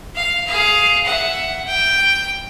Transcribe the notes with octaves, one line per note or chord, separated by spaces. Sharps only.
F5
G#4 F5
E5 F#5
G5